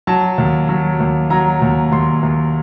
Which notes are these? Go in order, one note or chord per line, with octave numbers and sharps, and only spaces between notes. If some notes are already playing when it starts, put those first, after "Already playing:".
F#3 A5
D#2
F#3
D#2
F#3 A#5
D#2
D#2 C6
D#2